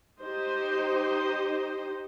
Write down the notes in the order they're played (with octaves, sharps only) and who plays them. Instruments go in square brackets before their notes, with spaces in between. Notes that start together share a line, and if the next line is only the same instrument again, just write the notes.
[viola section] D#4 G4 C5 D#5